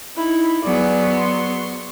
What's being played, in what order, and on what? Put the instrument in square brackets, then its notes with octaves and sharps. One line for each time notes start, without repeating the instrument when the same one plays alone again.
[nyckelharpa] D#4 E4
[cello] F#3 B3 [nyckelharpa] G#4 D5
[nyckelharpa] C6 C#6